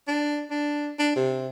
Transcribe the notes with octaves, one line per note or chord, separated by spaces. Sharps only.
D4
D4
D4
C3